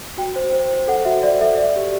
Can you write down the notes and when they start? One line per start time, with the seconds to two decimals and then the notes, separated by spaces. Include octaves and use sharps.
0.18 F#4 G5
0.36 C5
0.53 C5
0.71 C5
0.88 A4 F#5
1.05 F#4 E5
1.23 F#4 D5
1.41 A4 E5
1.57 D5
1.76 G4